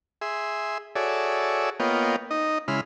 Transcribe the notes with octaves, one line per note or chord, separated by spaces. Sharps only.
G#4 E5 C6
F#4 G#4 A4 C#5 D5 E5
A#3 B3 F4 C#5 D#5 G5
D#4 D#5
C#3 G#3 E4 B5 C6 F6